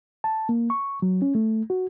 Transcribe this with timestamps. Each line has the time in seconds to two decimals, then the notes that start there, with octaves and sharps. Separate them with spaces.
0.24 A5
0.49 A#3
0.70 C#6
1.02 F#3
1.22 C#4
1.35 A3
1.70 F#4